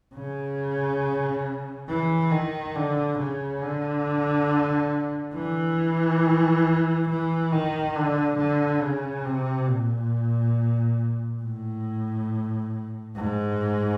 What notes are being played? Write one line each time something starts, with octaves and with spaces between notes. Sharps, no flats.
C#3
E3
D#3
D3
C#3
D3
E3
E3
D#3
D3
D3
C#3
C3
A#2
A2
G#2